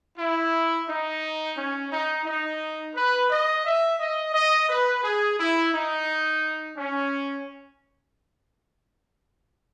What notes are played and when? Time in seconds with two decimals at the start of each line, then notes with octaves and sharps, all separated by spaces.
0.17 E4
0.87 D#4
1.57 C#4
1.91 D#4
2.26 D#4
2.96 B4
3.30 D#5
3.65 E5
4.00 D#5
4.34 D#5
4.69 B4
5.03 G#4
5.39 E4
5.73 D#4
6.77 C#4